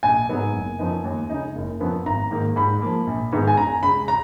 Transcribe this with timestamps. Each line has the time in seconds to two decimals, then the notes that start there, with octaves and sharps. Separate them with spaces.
0.03 A#1 G#5
0.29 G#2 F#3 B3 D#4
0.54 F#1
0.79 F#2 F3 B3 D#4
1.04 D#2
1.30 C#3 G#3 D#4
1.56 F#1
1.80 F#2 F3 B3
2.06 G#1 A#5
2.31 G#2 D#3 A#3
2.56 G#2 B5
2.82 F3 A#3
3.07 A#1
3.32 G#2 D#3 G#3 B3
3.47 G#5
3.57 F#2 A#5
3.83 C#3 G#3 B5
4.08 A#5